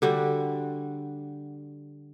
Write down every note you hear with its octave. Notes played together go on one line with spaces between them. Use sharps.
D3 G3 F#4